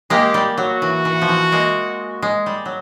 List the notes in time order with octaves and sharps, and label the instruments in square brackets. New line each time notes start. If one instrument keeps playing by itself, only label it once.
[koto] G#3 A#3 [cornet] G4
[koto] G3
[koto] F#3 [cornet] F#4
[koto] E3
E3
F3
E3
G#3 A#3
G#3
G3
F#3